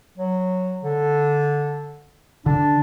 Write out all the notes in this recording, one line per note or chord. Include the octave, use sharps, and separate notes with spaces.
F#3
D3
D3 D4